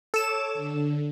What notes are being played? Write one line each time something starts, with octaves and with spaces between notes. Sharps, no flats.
A4 C#5 D6 E7
D3